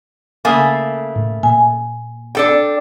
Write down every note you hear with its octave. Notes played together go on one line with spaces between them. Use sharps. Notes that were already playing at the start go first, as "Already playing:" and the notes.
C#3 A3 A#3 G#5 D#6
A2
A#2 G#5
D4 A4 G5